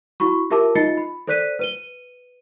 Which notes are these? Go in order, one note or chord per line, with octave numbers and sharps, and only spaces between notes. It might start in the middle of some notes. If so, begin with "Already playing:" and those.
E4 F#4 B5 C#6
F4 G4 A#4 E5 A5 D6
D#4 F4 D#5 A6 C7 C#7
B5
A4 C5 D5 F#6 B6 D#7
B4 D#7 G7